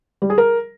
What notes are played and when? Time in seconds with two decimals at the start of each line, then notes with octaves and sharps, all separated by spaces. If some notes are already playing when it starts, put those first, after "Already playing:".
0.22 G3
0.30 G#4
0.38 A#4